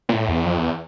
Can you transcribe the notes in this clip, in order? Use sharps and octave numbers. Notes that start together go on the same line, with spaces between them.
A#2
A2
E2
F2
E2